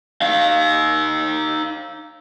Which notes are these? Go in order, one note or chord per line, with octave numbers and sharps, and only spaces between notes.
D#4 F5